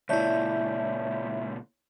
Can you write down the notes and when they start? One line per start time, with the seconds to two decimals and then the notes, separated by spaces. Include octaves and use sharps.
0.09 C#2 A#2 E4 C#5 D5 E5 A5 G6